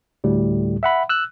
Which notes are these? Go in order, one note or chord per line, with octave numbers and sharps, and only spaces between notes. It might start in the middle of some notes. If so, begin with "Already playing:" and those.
D2 A2 G3
E5 F#5 B5
E6 F#6